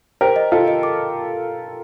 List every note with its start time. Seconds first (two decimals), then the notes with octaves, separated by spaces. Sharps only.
0.21 G4 A#4 C5
0.36 D#5
0.51 F4 A4 D#5
0.68 D#5
0.83 D6